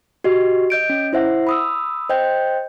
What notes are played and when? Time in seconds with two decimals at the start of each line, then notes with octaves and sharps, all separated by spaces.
0.24 F#4 G4 D#5
0.70 D#5 G6 D7
0.90 C#4
1.13 E4 C5 E5 F#5
1.47 B5 D#6 E6
2.10 C5 D#5 G5 G6